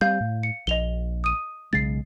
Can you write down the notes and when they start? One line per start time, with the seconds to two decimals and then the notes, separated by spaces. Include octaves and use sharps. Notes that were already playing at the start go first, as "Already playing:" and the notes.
0.01 G3 C4 F5 G6
0.21 A2
0.43 C#7
0.67 A#1 D#5 F7 G7
1.24 D#6 D#7
1.73 B1 C#3 G#3 A6 C7